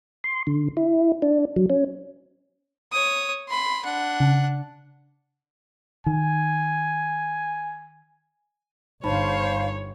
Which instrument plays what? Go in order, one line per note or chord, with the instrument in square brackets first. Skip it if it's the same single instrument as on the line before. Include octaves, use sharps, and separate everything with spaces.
[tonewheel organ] C6
D3
E4
D4
F#3
C#4
[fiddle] C#5 D#6
B5 C6
D4 F#5
[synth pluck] C#3
[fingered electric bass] D#3 [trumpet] G#5
[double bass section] G1 [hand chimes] D#4 A5 B5 [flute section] C5 F5 [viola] C#5